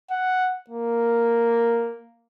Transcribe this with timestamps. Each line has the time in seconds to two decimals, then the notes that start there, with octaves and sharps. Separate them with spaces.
0.11 F#5
0.70 A#3